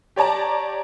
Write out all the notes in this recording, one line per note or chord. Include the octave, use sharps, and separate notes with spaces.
G4 C#5 D5 A5 A#5